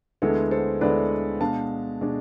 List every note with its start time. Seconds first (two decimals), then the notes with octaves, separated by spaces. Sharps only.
0.22 D2 D3 G#3 B3 E4 A4
0.51 A4 C5
0.81 D2 D3 G#3 B3 E4 B4 D5
1.41 B2 G#3 D4 F5 A5
2.01 B2 G#3 D4